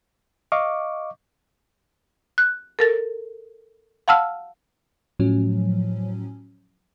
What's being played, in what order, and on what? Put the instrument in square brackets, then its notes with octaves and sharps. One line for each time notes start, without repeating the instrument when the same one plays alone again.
[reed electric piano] D#5 F5 C#6 D6
[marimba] F#6
A4 A#4 A6
F5 F#5 A5 E6 F6
[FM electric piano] A2 F3 F#3 C#4